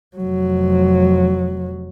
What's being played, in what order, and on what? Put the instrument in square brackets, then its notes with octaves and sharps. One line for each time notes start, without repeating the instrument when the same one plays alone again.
[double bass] F1 F#3